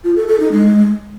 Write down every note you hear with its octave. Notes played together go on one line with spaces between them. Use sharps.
F4
A4
A4
D#4
G#3